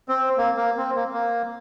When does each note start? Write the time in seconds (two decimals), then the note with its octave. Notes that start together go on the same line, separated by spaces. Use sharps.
0.08 C4
0.38 A#3
0.57 A#3
0.77 C4
0.96 A#3
1.13 A#3